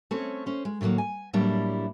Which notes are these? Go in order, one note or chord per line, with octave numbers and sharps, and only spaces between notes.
A3 C4 C#4 C#5
C#4 C5
G#3
A2 D#3 E3 F#3 A#3
G#5
A2 F#3 G3 A#3 D4 E4